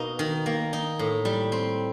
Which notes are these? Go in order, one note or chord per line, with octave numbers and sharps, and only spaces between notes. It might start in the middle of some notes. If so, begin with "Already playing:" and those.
Already playing: B2 A#3 D#4
D#3
A#3
D#4
A2
G3
C4